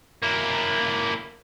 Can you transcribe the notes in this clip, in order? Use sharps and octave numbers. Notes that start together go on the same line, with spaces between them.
A#3 E4